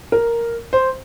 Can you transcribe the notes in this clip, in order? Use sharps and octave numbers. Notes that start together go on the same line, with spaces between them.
A#4
C5